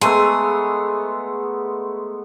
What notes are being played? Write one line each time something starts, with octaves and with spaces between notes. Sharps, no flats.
G#3 A3 B3 G#4 A#5 C6 E6